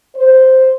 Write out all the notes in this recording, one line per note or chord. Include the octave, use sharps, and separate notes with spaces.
C5